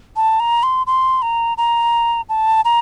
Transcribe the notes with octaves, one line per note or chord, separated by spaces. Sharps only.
A5
A#5
C6
C6
A#5
A#5
A5
A#5